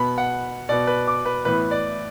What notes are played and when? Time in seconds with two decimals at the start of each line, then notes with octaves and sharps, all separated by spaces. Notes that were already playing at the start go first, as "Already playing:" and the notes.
Already playing: B2 B3 B5
0.18 F#5
0.69 B2 B3 D5
0.87 B4
1.07 D6
1.25 B4
1.45 A2 E3 B3 B4
1.71 D5